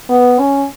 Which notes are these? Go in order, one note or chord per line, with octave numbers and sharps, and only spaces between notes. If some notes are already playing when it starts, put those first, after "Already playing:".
B3
C#4